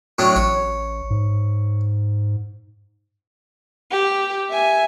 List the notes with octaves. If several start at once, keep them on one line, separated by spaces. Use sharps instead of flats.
A2 F#3 D4
A1 C#5
G#2
G4
E5 G#5